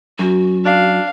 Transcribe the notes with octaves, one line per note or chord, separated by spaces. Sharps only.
F#2 F#4
D4 F5